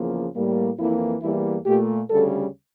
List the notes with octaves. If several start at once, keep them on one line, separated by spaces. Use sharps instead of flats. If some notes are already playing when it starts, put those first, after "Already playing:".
Already playing: E2 C#3 F3 A#3
A2 G3 A#3
F2 E3 A#3 E4
E2 E3 G3 A#3 E4
A#2 A3 G4
D2 C#3 G3 A4